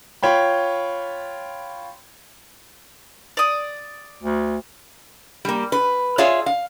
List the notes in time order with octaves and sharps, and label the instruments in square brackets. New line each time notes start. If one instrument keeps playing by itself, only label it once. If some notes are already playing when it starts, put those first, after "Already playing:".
[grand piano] F4 C#5 G5 B5
[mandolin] D5 D#6
[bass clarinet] D2
[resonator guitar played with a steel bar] G3 A#3
B4
F4 G#4 C#5 E5 F5 G#5
F5